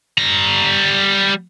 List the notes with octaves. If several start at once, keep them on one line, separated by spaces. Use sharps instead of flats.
G3 A#5